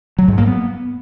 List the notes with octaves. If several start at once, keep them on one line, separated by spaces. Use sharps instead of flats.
F#3
G#2
A#3
B3